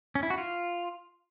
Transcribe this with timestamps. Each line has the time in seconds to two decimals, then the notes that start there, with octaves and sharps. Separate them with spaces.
0.15 C#4
0.23 E4
0.30 F#4
0.38 F4